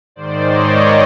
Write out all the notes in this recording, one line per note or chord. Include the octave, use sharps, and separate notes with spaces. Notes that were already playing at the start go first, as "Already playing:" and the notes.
G#2 D#3 C5 D5
C#5 D#5